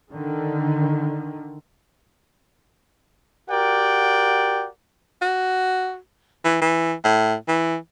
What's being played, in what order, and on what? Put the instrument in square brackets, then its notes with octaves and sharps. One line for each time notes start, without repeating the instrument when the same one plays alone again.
[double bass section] D3 D#3
[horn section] F#4 G4 A#4 D5 F#5 G5
[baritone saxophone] F#4
E3
E3
A2
E3